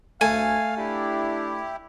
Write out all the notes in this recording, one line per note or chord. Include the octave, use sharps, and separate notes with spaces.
D2 A3 F5 G#5
D4 E4 G4